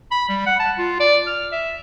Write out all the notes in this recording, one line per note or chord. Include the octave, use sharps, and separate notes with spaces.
B5
G3
F#5
A5
F4
D5
F6
E5